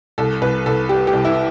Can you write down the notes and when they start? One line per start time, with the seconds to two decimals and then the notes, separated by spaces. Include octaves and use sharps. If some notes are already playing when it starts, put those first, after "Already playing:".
0.18 C2 A4
0.42 C2 B4
0.66 C2 A4
0.89 G3 G4
1.07 G4
1.13 C2
1.25 E4